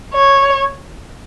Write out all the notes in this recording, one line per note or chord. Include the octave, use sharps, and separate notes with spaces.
C#5